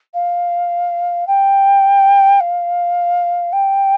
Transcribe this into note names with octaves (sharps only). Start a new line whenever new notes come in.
F5
G5
F5
G5